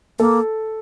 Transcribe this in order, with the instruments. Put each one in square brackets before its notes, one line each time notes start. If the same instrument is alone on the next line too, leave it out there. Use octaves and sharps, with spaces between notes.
[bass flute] A#3 [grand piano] A4